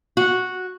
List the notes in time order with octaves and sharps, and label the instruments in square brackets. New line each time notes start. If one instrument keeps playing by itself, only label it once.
[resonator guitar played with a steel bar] F#4